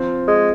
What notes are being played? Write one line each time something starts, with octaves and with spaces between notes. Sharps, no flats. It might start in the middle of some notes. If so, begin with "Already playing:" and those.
Already playing: F3 C4 F4 C5
G#3